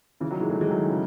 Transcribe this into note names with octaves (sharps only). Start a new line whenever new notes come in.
C#3 E3
D#3 F#3
E3 G#3
F#3 A3
E3 G#3
D#3 F#3
C#3